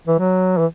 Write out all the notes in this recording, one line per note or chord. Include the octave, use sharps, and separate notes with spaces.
E3
F#3
E3